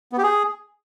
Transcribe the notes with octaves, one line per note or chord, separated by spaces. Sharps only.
B3
G4
G#4